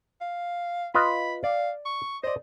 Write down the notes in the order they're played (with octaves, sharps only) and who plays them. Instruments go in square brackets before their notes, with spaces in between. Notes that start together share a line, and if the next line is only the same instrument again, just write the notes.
[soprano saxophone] F5
[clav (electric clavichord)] F4 B4 D#5 [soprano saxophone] B5
[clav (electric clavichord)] D5 [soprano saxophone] F5
[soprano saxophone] C#6
[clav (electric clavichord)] C5 D5 [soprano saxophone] D#5